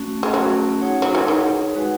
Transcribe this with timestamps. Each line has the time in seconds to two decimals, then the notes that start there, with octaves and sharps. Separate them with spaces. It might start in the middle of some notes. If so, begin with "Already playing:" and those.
Already playing: A3 C#4 F#4
0.23 G#3
0.34 F#3 A3 C#4 F#4
0.81 D#4 G#4 C#5 F#5
1.02 F#3
1.15 E3
1.28 D#3 D#4 G#4 C#5 F#5
1.75 G#3 D#4 F#4 B4